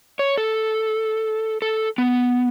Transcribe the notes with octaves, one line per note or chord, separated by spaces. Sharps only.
C#5
A4
A4
B3